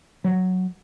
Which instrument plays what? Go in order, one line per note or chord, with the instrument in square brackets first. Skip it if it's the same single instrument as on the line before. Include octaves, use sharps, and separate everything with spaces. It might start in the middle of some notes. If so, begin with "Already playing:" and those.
[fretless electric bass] F#3